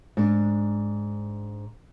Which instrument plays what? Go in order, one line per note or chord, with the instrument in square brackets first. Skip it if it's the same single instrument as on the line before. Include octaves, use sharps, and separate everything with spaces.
[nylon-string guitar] G#2 D4